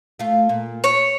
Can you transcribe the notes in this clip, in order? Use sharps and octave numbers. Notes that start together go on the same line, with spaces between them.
A3 F4
A#2
C#5